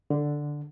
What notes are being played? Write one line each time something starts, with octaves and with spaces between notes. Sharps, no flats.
D3